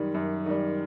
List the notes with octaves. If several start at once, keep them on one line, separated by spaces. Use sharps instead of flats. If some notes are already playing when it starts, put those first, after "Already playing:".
Already playing: F#2 D#3 G3
F#2
D#3 G3